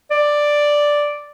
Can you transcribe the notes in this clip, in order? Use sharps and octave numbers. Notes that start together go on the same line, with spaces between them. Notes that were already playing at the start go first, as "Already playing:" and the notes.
D5